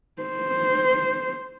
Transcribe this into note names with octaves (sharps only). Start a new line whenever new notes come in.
C5